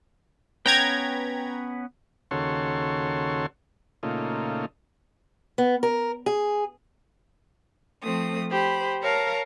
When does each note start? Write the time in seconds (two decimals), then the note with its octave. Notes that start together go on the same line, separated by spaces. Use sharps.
0.66 B3 C#4 B4 G5 A#5 G#6
2.31 D#2 C#3 F#4 A4 C#5 C6
4.03 A#2 C#3 A3 D#4 F4
5.58 B3
5.83 A#4
6.26 G#4
8.03 F3 A3 C4 D#6
8.51 G4 C5 B5
9.02 A#4 C#5 F5 A5 A#5